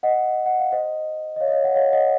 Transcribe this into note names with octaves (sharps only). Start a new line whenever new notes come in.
D#5 F#5
F#5
F5
C5 D#5
D#5
C#5 F5
D#5
C#5 F5
D#5 F#5
C#5 F5
D#5 F#5